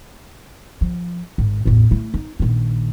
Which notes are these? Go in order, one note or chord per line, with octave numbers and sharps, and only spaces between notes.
F3
G#1
A1 E2
A3 E4
D#4
A#1 D#3